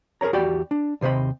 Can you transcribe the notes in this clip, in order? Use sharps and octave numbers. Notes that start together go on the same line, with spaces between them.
G#4 A#4 B4 C#5 A#5
E2 F#4 G4 D5 G5 B5
D4
D#2 C3 C5 D#5 B5